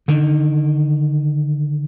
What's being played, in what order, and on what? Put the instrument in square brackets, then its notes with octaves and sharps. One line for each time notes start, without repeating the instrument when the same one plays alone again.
[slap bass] D3 D#3